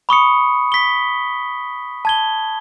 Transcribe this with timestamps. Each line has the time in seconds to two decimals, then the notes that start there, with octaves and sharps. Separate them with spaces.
0.09 B5 C#6 D#6 C#7
0.72 B6 G7
2.05 A5 G#6 G7